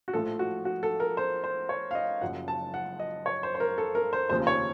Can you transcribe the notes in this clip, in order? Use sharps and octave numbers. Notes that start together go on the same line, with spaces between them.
F#4
A#1 A2 F3 A4
F#4
F#4
A4
A#4
C5
C5
C#5
F5
D#5
F#1 F#2 C#3 F3 F#5
A5
F#5
D#5
C#5
C5
C5
A#4
A4
A#4
C5
F1 D#2 C#3 F3 C5
C#5